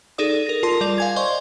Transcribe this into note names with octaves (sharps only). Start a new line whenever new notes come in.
D#4 G#4 A4 D5 D#6
A#4 A#6
F4 A#4 A5 C6
G3 D5 F7
F5 G#5 G#6
C5 D5 D#5 C6 C#6